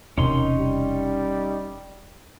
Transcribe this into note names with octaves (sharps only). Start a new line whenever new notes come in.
E1 D#2 C3 C#4 D#4 C6
G3